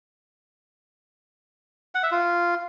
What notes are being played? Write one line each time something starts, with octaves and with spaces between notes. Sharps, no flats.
F#5
E5
F4